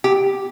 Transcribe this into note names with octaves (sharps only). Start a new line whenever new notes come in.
G4